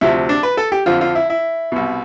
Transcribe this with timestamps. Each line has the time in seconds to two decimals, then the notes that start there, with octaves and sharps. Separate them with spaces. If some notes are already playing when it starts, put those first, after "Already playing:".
0.01 D2 C3 F3 E4
0.29 D4
0.43 B4
0.57 A4
0.72 G4
0.86 F2 D3 F3 F4
1.01 F4
1.15 E4
1.30 E4
1.72 C2 B2